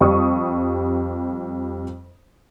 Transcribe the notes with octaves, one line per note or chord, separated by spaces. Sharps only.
F2 G3 C#6 D#6